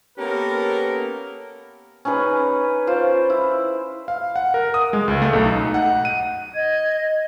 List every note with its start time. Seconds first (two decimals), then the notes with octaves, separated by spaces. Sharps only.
0.19 A#3 B3 C#4 G4 A4 A#4
2.05 C#4 D#4 G#4 B4
2.87 F4 C5 D5
3.30 E4
4.08 F5
4.36 F#5
4.54 A#4
4.74 D#6
4.93 G#3
5.08 C#2
5.22 A3
5.33 B1
5.46 D#4
5.74 F#5
6.05 D#7
6.54 D#5 G#6